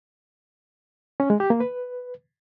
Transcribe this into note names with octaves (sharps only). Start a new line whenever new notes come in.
C#4
G#3
G4
A#3
B4